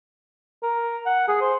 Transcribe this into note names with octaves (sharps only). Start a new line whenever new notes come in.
A#4
F#5
G#4
C5